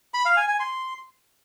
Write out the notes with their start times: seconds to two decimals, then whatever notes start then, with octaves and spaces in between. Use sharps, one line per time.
0.14 B5
0.25 F5
0.37 G#5
0.48 G#5
0.60 C6